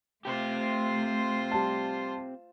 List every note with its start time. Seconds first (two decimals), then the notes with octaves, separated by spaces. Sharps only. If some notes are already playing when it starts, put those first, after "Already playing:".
0.25 A3 C4 F4 G4 C5
1.52 G3 A5